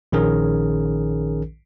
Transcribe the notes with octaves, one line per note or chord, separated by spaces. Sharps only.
A#1 D#3 C#4 G#4 A#4